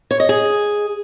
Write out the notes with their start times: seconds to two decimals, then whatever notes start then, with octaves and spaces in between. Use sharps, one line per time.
0.11 C#5
0.20 D#5
0.29 G#4